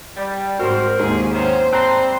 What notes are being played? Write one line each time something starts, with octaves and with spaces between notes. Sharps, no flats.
G3
G#2 C4 F#4 A#4 C5 C6
D#2 G#2 G#4
C3 B3 C#4 C5
G3 C4 A5 A#5 C6 F#6